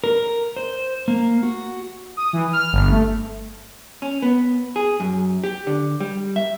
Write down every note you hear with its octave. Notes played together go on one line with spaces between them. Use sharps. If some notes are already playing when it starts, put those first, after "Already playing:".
A#4
C5
A#3
F#4
D#6
E3
F6
G1
A3
C#4
B3
G#4
F#2
G4
D3
G3
E5